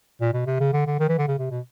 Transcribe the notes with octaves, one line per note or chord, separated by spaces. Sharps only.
A#2
B2
C3
C#3
D3
D3
D#3
E3
D3
C#3
C3
B2